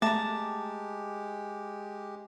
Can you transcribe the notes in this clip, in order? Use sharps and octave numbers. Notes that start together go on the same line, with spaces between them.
G#3 A3 G4 A5 A#5 D6